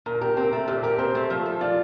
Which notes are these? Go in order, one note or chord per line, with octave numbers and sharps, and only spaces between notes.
A#2 A#4
G4 A#4
C4 A#4
A3
A#2 G4
G4 A#4
C4 C5
A3
F3
A4
F4 D5